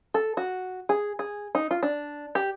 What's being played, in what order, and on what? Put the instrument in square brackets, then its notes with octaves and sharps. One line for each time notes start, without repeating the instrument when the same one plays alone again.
[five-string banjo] A4
F#4
G#4
G#4
D#4
F4
D4
G4